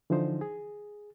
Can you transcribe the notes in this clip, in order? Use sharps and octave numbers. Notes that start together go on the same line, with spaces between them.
D3 E3 F3 D#4 C5
G#4